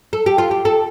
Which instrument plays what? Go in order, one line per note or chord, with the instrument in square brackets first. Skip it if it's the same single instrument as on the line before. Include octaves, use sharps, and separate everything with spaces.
[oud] A4
G4
F4
G4
A4